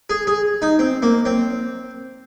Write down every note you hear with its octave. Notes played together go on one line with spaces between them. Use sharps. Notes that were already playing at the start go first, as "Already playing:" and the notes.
G#4
G#4
D#4
C4
A#3
C4